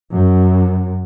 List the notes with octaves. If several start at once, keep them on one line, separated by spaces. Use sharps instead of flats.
F#2